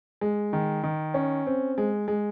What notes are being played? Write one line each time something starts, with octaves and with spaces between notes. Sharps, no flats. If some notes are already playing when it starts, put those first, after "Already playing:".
G#3
D#3
D#3
C#4
C4
G#3
G#3